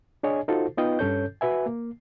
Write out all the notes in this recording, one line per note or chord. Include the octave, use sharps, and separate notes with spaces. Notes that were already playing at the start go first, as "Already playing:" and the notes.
D4 G#4 C#5 D#5 G#5
D#4 F4 F#4 A4 C5
B3 D#4 F4 B4 D#5 G5
G2 C#4 A4 C#5 G6
F#4 B4 E5 G#5
A#3